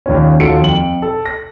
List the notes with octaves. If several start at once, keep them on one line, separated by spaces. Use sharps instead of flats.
D#2 A#2 C#4
D#2 F4 F#4 A4 C#7 D7
F2 F#7
A4
A#6